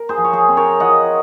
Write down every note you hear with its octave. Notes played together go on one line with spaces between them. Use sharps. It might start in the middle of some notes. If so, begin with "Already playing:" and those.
Already playing: A#4
G#4 C5
F3
C#5
G#4 C5
C4
A#4 C#5
F4 D#5 F#5